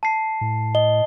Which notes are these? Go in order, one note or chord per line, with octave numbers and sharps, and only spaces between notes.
A5 C7
A2
D#5 G7